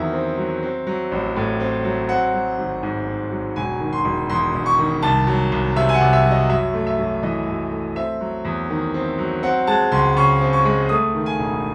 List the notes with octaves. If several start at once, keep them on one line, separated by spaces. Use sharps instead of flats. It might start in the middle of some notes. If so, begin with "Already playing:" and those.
Already playing: E2 D#3 F#3 C4 E5
C4
F#3
C4
F#3
A1
A2
C4
F#3
C4 F#5
F#3
G#1
G#2
C4
F#3
E1 G#5
D#3
C6
E1
E2 C6
E1
C#6
D#3
C2 A5
F#3
C2
C3 E5
G#5
F#5
C2
E5
F#3
D#5
F#2 E5
A3
E5
F#2
E3 D#5
F#2
A3
C4 E5
F#3
E2
D#3
C4
F#3
C4 F#5
G#3 A5
C#2 C6
C#3 C#6
C4
C#6
G#3
A3 D#6
D#3
G#5
E1